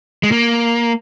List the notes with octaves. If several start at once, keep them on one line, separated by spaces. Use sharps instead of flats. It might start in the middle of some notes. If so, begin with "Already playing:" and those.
G#3
A#3